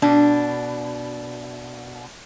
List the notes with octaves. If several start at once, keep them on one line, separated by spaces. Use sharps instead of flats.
B2 D4